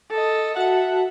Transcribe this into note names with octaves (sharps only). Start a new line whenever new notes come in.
A4 D#5
F#4 E5 F#5 A5